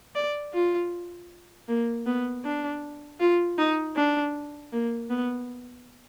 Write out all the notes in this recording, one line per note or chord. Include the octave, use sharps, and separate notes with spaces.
D5
F4
A#3
B3
D4
F4
D#4
D4
A#3
B3